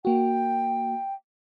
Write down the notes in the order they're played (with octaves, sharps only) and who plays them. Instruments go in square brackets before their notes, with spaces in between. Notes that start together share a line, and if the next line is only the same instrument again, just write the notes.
[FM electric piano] A#3 F#4 [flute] G5